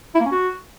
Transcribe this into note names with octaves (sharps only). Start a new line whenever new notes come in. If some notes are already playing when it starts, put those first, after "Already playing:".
E4
A#3
C#4
F#4